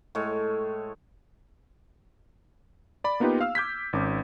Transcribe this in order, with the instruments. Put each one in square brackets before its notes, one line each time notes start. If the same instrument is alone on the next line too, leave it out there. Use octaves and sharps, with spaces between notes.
[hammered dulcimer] A2 G#3 C#5
[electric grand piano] D5 B5
A#3 B3 D#4 F4 G4 B4
F5 E6 F6
D6 G6 G#6 B6
G#1 C#4 D6